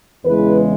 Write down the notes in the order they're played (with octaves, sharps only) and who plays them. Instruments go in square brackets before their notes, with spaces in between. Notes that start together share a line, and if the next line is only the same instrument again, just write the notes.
[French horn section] E2 C#3 E3 G#3 B4